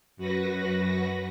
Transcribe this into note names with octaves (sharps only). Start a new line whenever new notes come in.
F#2 F#4 B4 A#6